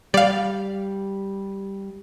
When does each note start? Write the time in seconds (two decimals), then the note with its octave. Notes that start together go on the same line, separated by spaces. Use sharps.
0.14 G3 D5 F5